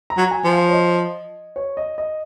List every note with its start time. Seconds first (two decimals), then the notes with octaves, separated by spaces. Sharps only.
0.10 A#5
0.17 F#3
0.31 G#5
0.44 F3
0.52 F5
0.69 C#5
0.72 D#5
1.56 C#5
1.77 D#5
1.98 D#5